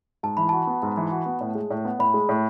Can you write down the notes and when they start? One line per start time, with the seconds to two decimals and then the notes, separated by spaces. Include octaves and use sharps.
0.23 G#2 A5
0.37 E3 B5
0.49 F#4 A5
0.67 B3
0.83 G#2
0.97 E3
1.11 F#4
1.26 B3
1.41 A2
1.55 G#3
1.70 A2
1.85 B3
1.99 A2 B5
2.14 G#3
2.29 A2